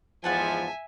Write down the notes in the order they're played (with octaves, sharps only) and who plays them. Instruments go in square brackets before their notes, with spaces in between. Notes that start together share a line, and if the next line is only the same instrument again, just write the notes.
[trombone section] E2 G#2 F3 [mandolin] G4 F#5 A5 [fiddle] E5 G#5